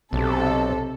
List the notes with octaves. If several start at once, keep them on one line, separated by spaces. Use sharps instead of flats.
B1 C3 A4